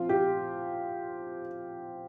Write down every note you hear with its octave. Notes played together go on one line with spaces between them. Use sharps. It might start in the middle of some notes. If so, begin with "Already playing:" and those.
Already playing: F3 C4 F4
G4